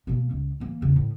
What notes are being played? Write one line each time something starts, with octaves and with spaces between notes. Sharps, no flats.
B2 A#3
C#2
E3 A#3
E2 C#3
A2